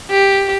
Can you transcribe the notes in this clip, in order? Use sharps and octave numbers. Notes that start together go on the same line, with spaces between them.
G4